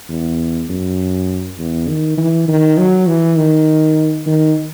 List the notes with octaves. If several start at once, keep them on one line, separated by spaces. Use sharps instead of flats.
E2
F#2
E2
D#3
E3
D#3
F#3
E3
D#3
D#3